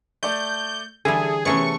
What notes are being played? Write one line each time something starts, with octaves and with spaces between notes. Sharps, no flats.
A3 D5 G6
D3 E3 G3 G#4 A4 E5 G#5
C3 E3 A3 B3 C#4 G#4 C#6